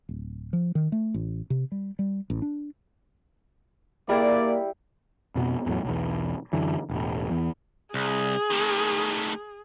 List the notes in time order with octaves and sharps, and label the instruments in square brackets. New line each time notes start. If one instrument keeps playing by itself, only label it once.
[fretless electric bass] D1
F3
D#3
A3
A1
C3
G3
G3
A1
D4
[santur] G3 G4 [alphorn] A#3 [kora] E4 G#4 F5 [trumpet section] D5
[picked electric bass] F2 B2 B3
E2 A2 F#3
B1 E2
F#2 D3 E3
E1 A1
E2
[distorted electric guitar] C2 [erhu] G#4
[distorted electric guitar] A2 D#3